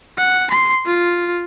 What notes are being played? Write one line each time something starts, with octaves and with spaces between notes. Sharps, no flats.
F#5
C6
F4